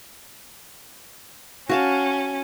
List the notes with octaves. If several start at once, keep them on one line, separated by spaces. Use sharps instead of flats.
C#4 F#4 F5 A5